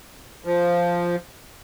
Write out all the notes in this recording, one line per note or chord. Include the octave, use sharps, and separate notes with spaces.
F3